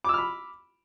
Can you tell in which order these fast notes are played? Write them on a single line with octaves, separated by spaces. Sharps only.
D6 E6 F6 B5